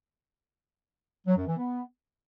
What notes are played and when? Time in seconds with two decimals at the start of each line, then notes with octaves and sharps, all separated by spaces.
1.27 F#3
1.37 F#2
1.47 E3
1.57 B3